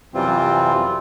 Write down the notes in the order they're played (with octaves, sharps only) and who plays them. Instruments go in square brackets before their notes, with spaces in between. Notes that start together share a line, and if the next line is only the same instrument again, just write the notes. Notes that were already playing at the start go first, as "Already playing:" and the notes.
[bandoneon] F#2 C3 E3 G3 C4 F4